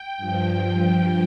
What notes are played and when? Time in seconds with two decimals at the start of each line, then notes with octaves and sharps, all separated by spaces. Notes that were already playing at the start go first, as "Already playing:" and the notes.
Already playing: G5
0.17 G2 F3